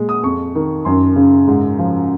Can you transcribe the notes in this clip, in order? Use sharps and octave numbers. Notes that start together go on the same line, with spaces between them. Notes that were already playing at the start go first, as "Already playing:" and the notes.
Already playing: A#2 G#3
D#6
F2 C#6
D#3
F#2 C6
C#3
G#2
F3